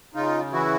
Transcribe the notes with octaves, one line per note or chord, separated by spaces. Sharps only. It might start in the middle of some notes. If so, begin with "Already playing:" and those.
C#3 D#4 F4
E3 E4 F#4